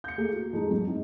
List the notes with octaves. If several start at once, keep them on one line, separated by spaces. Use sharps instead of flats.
G6 C#7
A3 A#3 G#4 A4
F#4
F2 G#3 D#4
F#2
G#2